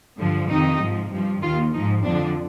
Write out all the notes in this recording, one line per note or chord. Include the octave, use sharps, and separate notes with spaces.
G2 D3 F3
F2 C3 D#3 D#4
G#2 F3
G2 F3
D#2 D#3 F4
G#2 F3 D#4
F2 D3 F3 D4